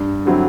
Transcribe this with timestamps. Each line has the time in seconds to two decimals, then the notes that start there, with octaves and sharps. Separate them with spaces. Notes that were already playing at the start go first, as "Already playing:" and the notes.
Already playing: G2
0.25 D3 F#3 C4 E4